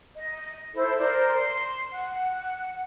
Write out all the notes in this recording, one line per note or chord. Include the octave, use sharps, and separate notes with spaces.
D#5
E4 A4 C5
A#4 C5 D5 C6
C6
F#5